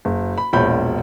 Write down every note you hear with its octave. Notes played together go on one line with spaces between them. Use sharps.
F#1
B5
E1 A#1 C#5 B5 G6